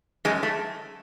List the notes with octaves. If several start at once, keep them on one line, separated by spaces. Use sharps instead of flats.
F#2 G#3
A3